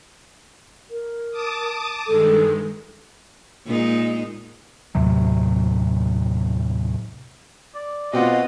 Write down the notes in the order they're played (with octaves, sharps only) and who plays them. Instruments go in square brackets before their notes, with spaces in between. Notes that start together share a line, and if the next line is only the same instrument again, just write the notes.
[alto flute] A#4
[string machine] A5 D6 D#6
[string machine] G2 D#3 G#3 [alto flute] A4
[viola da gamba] A#2 G#3 D#4
[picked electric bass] D#2 A2 C3 F#3
[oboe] D5
[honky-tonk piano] B2 C4 F#5 [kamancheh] F4 D#5